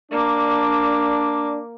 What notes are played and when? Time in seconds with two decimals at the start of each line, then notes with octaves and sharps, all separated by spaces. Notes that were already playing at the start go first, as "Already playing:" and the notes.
0.11 A#3 D4 D6